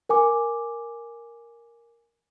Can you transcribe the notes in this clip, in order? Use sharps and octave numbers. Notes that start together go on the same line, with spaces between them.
A#4 G#5 D6